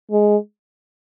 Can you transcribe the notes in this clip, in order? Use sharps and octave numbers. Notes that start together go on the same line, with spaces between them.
G#3